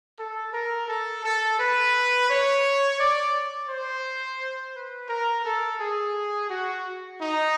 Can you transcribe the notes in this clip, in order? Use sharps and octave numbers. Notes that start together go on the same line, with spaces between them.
A4
A#4
A4
A4
B4
C#5
D5
C5
B4
A#4
A4
G#4
F#4
D#4